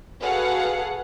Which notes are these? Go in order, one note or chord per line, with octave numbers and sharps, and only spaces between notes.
F#4 G#4 A4 B4 F5 F#5